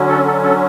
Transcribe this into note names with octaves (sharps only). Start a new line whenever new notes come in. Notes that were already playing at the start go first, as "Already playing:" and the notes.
Already playing: D3 F#3 C#4
A4
A4
A4